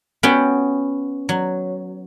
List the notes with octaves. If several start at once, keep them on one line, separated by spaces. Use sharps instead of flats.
B3 C#4 F#4 G5
F#3